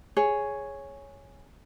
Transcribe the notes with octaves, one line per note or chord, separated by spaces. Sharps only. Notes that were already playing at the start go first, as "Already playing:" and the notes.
G#4 C#5